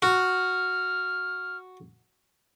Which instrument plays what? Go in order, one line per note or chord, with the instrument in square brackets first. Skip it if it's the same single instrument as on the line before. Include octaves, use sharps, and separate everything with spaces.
[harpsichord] F#4 [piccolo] F6